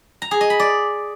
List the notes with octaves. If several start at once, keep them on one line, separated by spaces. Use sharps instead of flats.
A#5
G#4
D#5
B5
D5